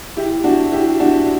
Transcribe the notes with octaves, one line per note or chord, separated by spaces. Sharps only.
E4 G4
D4 F#4
E4 G4
D4 F#4